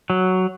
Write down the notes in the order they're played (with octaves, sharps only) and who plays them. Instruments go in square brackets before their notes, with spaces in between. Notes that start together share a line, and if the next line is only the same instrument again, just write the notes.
[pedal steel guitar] F#3